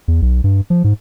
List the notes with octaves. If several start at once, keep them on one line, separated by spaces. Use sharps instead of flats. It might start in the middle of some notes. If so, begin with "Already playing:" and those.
E2
B1
G2
F3
G#2